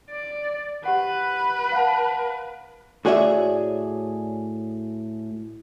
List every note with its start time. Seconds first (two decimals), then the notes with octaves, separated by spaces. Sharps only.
0.11 D5
0.85 G4 B4 F#5
1.72 F5 F#5 A5
3.05 A2 F#4 G#4 C#5 D5 E5